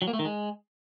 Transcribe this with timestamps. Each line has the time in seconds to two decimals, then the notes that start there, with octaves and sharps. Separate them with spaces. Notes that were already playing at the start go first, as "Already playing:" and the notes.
0.02 F#3
0.08 A#3
0.13 A3
0.19 D#3
0.25 G#3